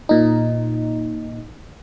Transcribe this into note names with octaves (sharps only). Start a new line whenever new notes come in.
A#2 D#4